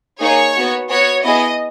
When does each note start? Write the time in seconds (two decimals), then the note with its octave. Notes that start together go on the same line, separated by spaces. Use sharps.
0.20 A#3 D#4 G#4 C#5
0.55 B3 F#4
0.90 B3 F#4 C#5
1.25 B3 E4 G#4 D#5